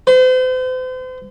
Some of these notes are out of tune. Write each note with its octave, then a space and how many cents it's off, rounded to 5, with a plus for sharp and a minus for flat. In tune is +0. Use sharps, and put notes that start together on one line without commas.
C5 -40